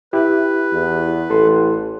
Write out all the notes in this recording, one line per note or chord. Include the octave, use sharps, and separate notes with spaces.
E4 G4 B4
E2
A1 A4 C6